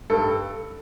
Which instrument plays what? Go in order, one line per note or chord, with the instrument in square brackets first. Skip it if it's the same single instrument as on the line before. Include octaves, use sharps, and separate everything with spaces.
[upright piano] G2 A4